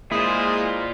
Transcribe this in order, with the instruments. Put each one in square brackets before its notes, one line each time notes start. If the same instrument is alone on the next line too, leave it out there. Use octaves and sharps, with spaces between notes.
[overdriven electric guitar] A#2 F4 [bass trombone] G#3 [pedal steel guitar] E4 C5 [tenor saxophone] G#4